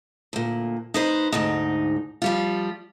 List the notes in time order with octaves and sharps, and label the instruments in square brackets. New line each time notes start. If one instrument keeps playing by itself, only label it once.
[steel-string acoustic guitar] D2 A#2
D#4 B4 C5
D2 G#2 D#4
F3 G3 F4